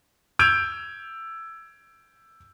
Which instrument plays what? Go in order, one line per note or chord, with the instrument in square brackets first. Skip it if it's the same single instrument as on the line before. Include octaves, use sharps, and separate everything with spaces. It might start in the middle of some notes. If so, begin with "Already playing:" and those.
[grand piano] E6 G6 G#6 D7 F7